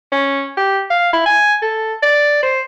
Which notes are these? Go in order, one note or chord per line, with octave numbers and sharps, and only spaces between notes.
C#4
G4
F5
E4
G#5
A4
D5
C5